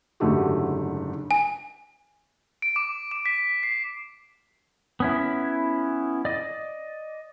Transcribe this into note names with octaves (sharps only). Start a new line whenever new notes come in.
F#1 G#2 D3 A3 F#4 G4
G#5
D7
D6
D6
B6
C7
B3 C#4 E4
D5 D#5